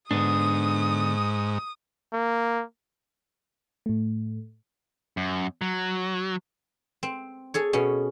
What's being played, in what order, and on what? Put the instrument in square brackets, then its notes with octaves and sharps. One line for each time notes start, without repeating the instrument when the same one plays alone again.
[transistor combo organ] G#2 [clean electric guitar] D3 B3 D4 [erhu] D#6
[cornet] A#3
[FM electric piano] A2 A3
[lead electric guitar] F#2
F#3
[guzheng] C4
G#4 A4 C#5
B2 C#4